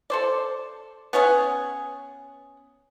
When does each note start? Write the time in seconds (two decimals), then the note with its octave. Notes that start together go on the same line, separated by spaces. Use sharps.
0.10 A4 C5 D5
1.13 B3 C#4 G#4 F#5